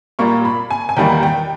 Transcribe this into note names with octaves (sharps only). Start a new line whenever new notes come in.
A#2 G3 A#3 C#6
B5
G#5
G#5
E2 D#3 G3 A#3 G5
G5